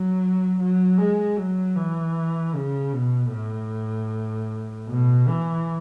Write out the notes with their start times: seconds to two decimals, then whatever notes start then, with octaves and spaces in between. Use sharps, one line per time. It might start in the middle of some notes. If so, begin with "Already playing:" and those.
Already playing: F#3
0.59 F#3
0.98 G#3
1.37 F#3
1.76 E3
2.54 C#3
2.93 B2
3.32 A2
4.88 B2
5.28 E3